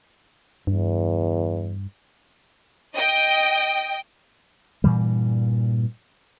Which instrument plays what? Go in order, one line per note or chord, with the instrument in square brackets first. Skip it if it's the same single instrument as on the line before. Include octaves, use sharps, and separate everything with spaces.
[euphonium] E2 [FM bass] G2
[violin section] D#5 G5
[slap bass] G2 A#2 E3 G3